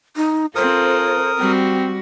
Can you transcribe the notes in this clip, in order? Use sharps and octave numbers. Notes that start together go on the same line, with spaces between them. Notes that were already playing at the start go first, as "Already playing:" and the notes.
D#4
C4 F4 A4 A#4 C5 D#6
G3 C4 F#4 G5